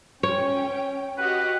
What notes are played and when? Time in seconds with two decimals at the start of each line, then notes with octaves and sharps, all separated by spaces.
0.23 C#4 C#5 G5
1.18 F#4 G4 B4 D#5